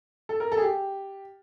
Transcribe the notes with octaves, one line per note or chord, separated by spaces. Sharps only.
A4
A#4
A4
G#4
G4